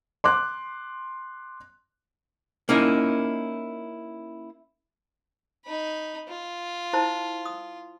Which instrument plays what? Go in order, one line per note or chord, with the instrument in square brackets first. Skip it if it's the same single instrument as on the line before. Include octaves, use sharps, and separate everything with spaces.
[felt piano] C6 D6 F#6
[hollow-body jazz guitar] A#3 C#4 D#4 E4
[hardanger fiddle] D#4 B5
F4
[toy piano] E4 C5 A5
D#6